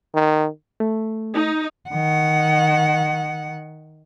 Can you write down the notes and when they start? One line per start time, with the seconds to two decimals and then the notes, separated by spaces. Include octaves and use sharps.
0.14 D#3
0.80 A3
1.34 D#4
1.90 D#3 F#5